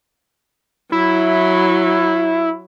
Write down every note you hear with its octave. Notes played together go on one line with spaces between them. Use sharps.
F#3 E4